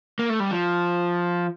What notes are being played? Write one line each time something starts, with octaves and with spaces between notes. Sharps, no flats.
A#3
A3
G3
F3